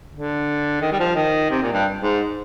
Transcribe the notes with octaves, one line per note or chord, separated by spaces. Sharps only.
D3
D#3
G3
F3
D#3
C3
A#2
G2
G#2